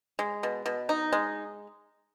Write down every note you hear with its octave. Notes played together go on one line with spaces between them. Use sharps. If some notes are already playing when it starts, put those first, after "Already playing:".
G#3
B2
B2
D#4
G#3